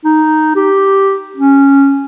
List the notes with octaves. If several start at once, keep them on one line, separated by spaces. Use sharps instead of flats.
D#4
G4
C#4